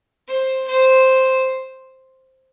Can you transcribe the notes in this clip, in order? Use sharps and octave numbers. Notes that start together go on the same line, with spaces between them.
C5
C5